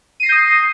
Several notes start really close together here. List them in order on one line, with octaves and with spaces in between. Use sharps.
D#7 C7 A#6 G6 D#6